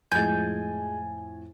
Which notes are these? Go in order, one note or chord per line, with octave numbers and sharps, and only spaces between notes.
F2 A2 F3 G#3 G#5 G6 A6